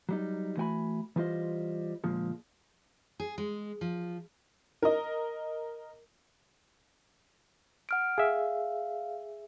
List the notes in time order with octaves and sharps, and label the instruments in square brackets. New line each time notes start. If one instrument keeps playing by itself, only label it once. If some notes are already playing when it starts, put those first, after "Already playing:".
[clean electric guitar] F#3 G3 D#4
E3 A3 F#4 G5 G#5 B5
E3 G3 F4 C5 D#5
D2 A#2 F3 G#3
[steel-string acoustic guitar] G#4
G#3
F3
[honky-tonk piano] A#4 D#5
[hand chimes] F#5 F6 D7
[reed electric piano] G#4 E5 [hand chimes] F5